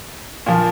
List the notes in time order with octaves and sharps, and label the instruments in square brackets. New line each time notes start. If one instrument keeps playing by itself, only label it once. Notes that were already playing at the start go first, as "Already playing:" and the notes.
[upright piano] A#2 F3